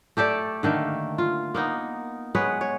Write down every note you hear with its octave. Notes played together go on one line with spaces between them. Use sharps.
A3 G4 A4 D5
D3 D#3 A3 A#3
F4
A#3 B3 D#4
G#3 B3 B4 C#5
C#5